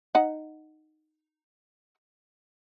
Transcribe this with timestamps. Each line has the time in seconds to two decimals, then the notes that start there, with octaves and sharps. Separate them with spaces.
0.15 D#4 F#5